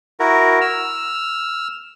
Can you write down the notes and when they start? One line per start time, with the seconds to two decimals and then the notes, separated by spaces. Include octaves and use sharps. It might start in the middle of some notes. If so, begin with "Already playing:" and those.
0.20 E4 F#4 A#4
0.61 E6 F6